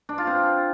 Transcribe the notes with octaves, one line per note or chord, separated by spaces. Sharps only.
D4
F4
C4